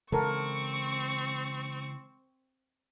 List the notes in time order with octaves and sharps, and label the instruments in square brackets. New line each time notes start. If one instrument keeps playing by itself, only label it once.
[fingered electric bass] C#3 E3 G#3 [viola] C4 C#6 [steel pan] A4 A#4